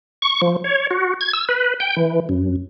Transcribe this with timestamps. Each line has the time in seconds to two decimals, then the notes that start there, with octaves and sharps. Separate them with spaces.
0.22 C#6
0.42 F3
0.64 C#5
0.91 F#4
1.21 G#6
1.33 E6
1.49 B4
1.80 G5
1.96 E3
2.29 F#2